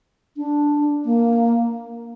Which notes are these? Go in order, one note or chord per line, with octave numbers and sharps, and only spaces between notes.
D4
A#3